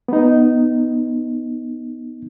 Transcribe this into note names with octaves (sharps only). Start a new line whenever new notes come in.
B3 D#4